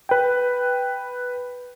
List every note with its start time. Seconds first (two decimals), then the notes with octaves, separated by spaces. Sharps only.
0.09 B4 G5